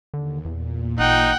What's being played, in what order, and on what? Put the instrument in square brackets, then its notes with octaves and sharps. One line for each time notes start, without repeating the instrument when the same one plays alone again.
[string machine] D#2 [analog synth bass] D3
[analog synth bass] E2 [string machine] A#2
[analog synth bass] A1 [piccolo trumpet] D#4 [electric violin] F#5 G5